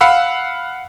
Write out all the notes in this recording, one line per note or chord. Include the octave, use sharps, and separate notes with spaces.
F5 F#5 B5 E6